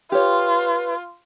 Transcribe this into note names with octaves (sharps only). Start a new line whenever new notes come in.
F4 G4 B4 C#5